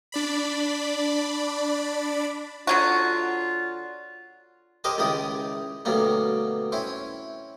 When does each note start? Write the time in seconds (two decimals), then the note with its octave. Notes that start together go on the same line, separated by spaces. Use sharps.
0.12 D4 D5 B5
2.67 D3 F#3 F4 F#4
4.84 C4 G4 A#4 D#5 G#5 A5
4.98 C#2 D#3 E4 G4 D#6
5.85 D2 B2 F#3 G3 A#3
6.72 C4 C#4 E4